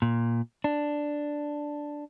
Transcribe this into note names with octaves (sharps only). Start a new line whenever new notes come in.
A#2
D4